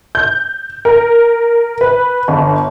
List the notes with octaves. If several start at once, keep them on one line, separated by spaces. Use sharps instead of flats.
G6
A#4
B4
G1